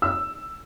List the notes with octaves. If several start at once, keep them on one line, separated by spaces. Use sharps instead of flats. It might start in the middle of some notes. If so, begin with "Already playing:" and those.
E6